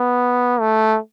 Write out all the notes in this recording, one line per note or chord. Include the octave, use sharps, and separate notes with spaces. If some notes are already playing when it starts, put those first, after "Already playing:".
Already playing: B3
A3